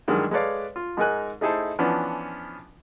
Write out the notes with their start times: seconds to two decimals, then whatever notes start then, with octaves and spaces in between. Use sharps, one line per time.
0.08 G2 D#3 E3 F#3 G#3
0.31 G#3 A4 B4 C#5 D5 F5
0.76 F4
0.97 G#2 G#3 D#4 A#4 G#5 F#6
1.41 A3 D#4 E4 G#4 A4 C5
1.79 E3 F3 B3 C#4 D4